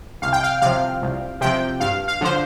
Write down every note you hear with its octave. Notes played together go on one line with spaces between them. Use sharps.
C2 F5
G5
F5
C3 F3 F5
C2
C3 F3 G5
G2 F5
F5
D3 F3 C5